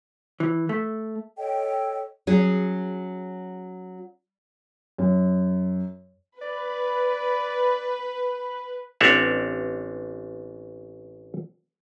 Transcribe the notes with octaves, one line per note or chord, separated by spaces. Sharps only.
E3
A3
A4 C#5 D#5 G5
F#3 C#4 G#4
F#2
B4 D5
A1 C4 D4 C#5 E5 F#5